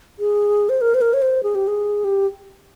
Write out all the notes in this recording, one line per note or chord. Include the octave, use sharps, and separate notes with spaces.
G#4
C5
A#4
C5
A#4
C#5
C5
G#4
G4
G#4
G4